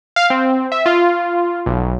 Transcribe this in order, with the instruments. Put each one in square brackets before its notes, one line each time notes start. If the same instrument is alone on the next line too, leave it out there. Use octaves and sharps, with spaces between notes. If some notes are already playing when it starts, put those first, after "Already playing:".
[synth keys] F5
C4
E5
F4
B1